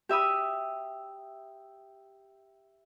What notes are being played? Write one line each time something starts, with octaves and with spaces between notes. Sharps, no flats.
G4 E5 B5 D#6